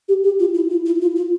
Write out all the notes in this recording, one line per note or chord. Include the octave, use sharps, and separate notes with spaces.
G4
G4
F4
E4
F4
E4
F4
F4